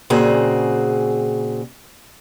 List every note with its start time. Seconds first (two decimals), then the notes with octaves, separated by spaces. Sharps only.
0.10 A#2 C#3 C4 F#4 G#4